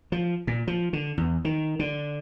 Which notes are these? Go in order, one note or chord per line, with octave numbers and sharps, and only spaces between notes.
F3
A#2
F3
D3
E2
D#3
D3